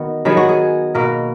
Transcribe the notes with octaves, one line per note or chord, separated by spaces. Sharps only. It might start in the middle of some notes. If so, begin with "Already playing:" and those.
Already playing: D#3 B3 F#4
D#3 F#3 B3 G#4
F#4
G#4
B2 A#3 A#4